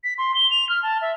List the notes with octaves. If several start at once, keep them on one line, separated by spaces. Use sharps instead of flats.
B6
C6
G7
F7
F6
A5
E5